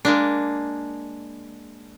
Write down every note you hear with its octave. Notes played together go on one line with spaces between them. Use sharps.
G#3 A#3 D4